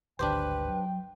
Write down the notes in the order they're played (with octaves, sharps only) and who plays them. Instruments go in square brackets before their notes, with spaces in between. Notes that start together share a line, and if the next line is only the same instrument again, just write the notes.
[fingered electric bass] D1 G#1 D2 [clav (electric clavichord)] D4 G4 C5 [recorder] B4 [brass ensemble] G5
[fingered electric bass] F#3